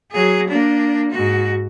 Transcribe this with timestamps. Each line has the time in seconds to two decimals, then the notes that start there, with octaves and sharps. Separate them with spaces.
0.12 F#3 G#4
0.48 A#3 D4
1.11 G#2 F#4